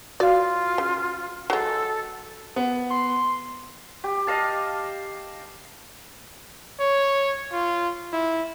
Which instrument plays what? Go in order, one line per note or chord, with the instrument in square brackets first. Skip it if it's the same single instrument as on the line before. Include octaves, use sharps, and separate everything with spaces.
[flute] F4 [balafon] F#4 F5 [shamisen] D5
[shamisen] C#3
[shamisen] F#3 G#3 [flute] A4
[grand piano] B3
[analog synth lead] C6
[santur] G4
D#5 F5 A5
[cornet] C#5
F4
E4